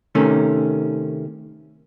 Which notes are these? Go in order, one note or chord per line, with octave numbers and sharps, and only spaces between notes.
C3 D#3 A3 C#4